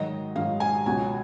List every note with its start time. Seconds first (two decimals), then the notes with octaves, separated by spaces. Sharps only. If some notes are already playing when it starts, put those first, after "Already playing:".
Already playing: G#2 D#3 F#3 D#5
0.36 G#2 D#3 F#3 F5
0.60 G#5
0.86 C#2 B2 F#3 C#4 G#5